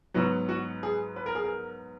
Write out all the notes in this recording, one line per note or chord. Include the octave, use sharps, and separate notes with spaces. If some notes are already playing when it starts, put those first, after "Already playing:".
G#2 F#3 B3 F#4
F#4
G#4
B4
A#4
G#4
A#4